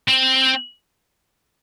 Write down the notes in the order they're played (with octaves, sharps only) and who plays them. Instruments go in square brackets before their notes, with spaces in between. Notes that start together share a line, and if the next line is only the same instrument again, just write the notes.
[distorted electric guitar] C4